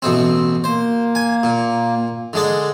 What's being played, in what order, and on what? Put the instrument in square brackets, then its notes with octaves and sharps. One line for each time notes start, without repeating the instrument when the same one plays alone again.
[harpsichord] A1 B2 C4
[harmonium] A#3 [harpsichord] C5
[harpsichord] G#5
A#2
D3 G#3 D5